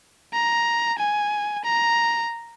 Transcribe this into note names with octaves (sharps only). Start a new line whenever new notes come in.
A#5
G#5
A#5